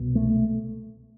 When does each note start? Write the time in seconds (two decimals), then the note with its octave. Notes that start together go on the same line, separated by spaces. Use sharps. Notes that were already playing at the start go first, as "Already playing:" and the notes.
Already playing: C2 B2
0.15 A3